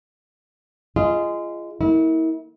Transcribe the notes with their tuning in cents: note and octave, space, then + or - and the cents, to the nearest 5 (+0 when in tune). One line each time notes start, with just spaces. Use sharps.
F4 -25 G#4 +0 D#5 +0
A#3 -5 E4 -35